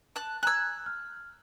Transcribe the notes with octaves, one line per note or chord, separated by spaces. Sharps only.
A5 F#6
G#5 A#5 E6 F#6 G#6
F6